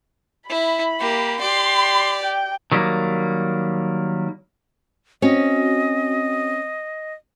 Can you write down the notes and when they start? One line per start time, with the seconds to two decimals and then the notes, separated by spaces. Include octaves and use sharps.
0.50 E4 B5
1.00 A#3 G4
1.40 G4 D5 C6
2.22 G5
2.72 D#3 F#3 G3 A#3
5.22 C4 C#4 F#4 D#5